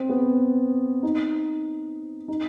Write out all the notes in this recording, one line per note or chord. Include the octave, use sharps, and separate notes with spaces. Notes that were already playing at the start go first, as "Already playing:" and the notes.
Already playing: C4
B3
D#4
D#4